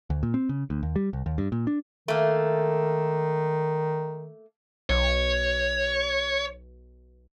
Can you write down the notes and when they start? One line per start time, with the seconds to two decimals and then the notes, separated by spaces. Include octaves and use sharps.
0.10 D2
0.23 A#2
0.34 C4
0.49 C#3
0.70 D2
0.83 D#2
0.96 G3
1.13 C2
1.26 D#2
1.38 G2
1.52 A#2
1.67 D4
2.08 D#3 A3 A#3
4.90 B1 C#5